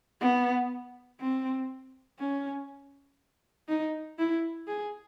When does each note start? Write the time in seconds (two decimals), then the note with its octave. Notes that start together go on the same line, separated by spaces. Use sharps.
0.21 B3
1.20 C4
2.19 C#4
3.68 D#4
4.18 E4
4.67 G#4